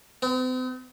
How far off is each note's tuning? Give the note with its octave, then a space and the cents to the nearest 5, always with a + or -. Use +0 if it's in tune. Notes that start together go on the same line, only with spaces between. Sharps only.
C4 -45